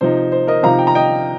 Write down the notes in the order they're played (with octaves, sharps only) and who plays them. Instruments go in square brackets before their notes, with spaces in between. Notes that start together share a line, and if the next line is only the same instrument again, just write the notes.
[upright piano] C3 F3 D#4 C5
C5
A#4 D#5
C3 F3 D#4 F5 A#5
G5
A#5
D#5 G5